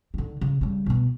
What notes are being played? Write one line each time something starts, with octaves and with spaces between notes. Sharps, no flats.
D3 D#3
C#3
C#3 G3
B2 B3